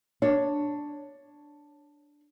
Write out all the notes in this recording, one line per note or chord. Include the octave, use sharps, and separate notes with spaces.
D4 C#5